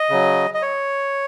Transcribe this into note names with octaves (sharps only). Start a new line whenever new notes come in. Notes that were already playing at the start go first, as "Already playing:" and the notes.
Already playing: D#5
C#3 F#3
D#5
C#5